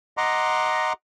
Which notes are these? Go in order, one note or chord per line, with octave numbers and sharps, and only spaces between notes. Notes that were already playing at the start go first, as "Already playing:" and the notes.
D#5 F#5 A#5 C6 D6